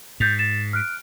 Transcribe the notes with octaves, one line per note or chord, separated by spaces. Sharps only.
G#2 G6 A6 F7
A6 E7
F6 F#6 D7